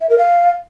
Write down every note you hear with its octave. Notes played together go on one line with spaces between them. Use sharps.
E5
A#4
F5